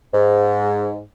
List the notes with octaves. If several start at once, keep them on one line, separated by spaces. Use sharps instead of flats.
G#2